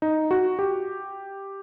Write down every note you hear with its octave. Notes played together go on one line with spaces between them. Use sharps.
D#4
F#4
G4